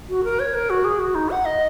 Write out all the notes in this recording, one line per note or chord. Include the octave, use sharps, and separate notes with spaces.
F#4
A#4
C#5
A#4
F#4
G#4
F#4
D#4
F#5
D#5